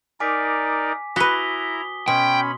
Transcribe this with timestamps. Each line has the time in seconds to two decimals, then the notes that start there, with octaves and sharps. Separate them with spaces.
0.20 D#4 A#4 D5 G#5 D6 B6
1.16 E4 F#4 B4 A#5 D#6 B6 G7
2.08 B2 C#4 G5 B5 C6